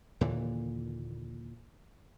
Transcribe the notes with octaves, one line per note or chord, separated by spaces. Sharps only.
D#2 A#2 D3 E3